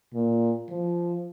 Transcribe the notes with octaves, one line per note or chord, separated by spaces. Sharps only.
A#2
F3